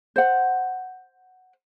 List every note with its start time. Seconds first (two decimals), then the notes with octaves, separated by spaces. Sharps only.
0.16 C5 F#5